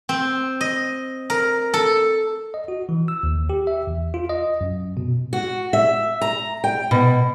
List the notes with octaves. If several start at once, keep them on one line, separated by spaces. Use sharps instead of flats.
C4
D#5
A#4
A4
D#5
F#4
E3
E6
D#2
G4
E5
E2
F4
D#5
F#2
B2
F#4
E5
A#5
G5
B2